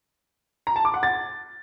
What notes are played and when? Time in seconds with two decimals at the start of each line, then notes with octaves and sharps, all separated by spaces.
0.67 A#5
0.76 A5
0.85 D6
0.94 F#5
1.03 A6